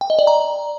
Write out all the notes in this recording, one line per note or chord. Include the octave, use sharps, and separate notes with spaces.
G5
D#5
D5
A#5